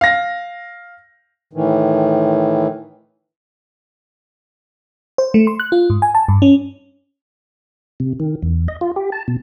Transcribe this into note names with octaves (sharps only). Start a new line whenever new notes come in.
F5 A#6
A2 D#3 E3
C5
A3
C6
F#6
F4
G#2
G#5
A5
G2
C#4
C3
D#3
E2
D#5
F4
G4
A5
B2